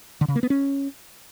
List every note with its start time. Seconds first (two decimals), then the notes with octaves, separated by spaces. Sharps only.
0.21 D3
0.28 C#3
0.36 A#3
0.43 B3
0.50 C#4